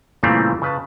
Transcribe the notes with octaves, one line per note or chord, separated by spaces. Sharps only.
A#2 C#3 E3 G3 A3 C4
C#3 B4 A5